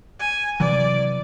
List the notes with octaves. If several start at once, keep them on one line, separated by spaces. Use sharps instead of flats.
G#5
C3 E3 F#3 D5